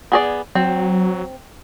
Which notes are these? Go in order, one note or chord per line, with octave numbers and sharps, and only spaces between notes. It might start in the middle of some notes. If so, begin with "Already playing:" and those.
B3 G#4 D5
F#3 C4